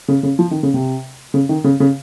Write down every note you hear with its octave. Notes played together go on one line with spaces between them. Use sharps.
C#3
C#3
F3
D#3
C#3
C3
C#3
D#3
C#3
C#3